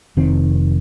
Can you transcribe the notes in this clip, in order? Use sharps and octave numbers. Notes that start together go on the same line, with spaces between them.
F1 D#3 C4